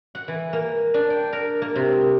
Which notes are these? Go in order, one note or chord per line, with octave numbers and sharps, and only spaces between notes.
F#5
E3
A#3
D4
G5
A#4
A#3
C3